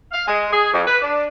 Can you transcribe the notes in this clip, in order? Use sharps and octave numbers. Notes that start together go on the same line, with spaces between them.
F5
G#3
G#4
F2
B4
D4